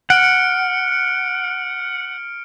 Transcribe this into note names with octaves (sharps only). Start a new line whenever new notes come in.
F#5 F6 C#7 D7